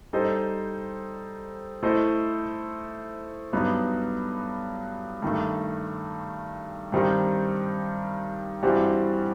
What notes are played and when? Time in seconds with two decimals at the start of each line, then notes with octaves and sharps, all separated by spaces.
0.13 G3 D#4 A4 C5 D#5
1.83 A3 E4 A4 C5 D#5
3.53 G2 F#3 B3 D#4
5.22 G2 D#3 A3
6.92 G2 D#3 G3 C4 D#4
8.63 G2 E3 G3 C4 F#4